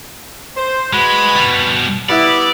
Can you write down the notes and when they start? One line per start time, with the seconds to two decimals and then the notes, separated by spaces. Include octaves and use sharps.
0.56 C5
0.93 G#3 F#4 B4 B5
1.36 B2 G3
2.09 G3 B3 E4 D5